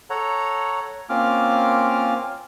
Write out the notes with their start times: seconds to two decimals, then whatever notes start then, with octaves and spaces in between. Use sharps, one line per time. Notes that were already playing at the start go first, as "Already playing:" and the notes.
0.10 A4 C#5 F#5 A#5
1.09 A#3 C4 C#4 F4 D6 F6